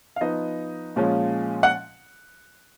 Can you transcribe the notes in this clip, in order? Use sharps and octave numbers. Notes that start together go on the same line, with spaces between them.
F5
F3 B3 D#4 D#5
A#2 F3 G#3 C#4 F4
F#5